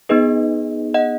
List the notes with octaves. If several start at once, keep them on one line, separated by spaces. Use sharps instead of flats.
B3 D#4 G#4 B4 D#5
D#5 F#5